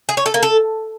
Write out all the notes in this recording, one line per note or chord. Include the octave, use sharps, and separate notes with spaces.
G#4
C#5
A4
A#3
A4